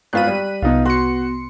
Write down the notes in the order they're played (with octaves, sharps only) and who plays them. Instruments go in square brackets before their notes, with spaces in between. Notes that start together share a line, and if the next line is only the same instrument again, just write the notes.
[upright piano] G#1 B3 F4 [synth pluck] F#6 B6 D#7
[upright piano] G3
[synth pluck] C2 B3 [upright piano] D#4 F4
[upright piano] F#4 [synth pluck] C6 C#7